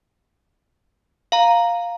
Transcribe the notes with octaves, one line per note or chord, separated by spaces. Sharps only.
F5 A#5